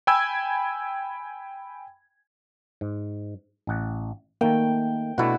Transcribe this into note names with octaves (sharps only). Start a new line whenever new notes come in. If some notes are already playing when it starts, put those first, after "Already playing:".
G5 G#5 B5 E6 G#6
G#2
A1 F#5
D#3 A3 A#3 G5
B2 A3 D4 E4 F#4